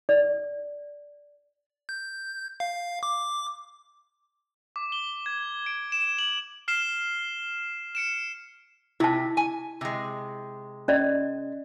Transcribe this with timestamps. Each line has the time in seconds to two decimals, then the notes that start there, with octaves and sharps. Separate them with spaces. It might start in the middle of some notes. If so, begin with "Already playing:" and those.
0.09 D5
1.89 G6
2.60 F5
3.03 D6
4.76 D6
4.92 G7
5.26 G#6
5.66 D7
5.92 E7
6.19 F#7
6.68 F6 C7 E7 G7
7.95 C#7 D7 E7
9.00 C3 E4 A5
9.37 G#5
9.81 C3 G#3
10.88 C#4 D5 D#5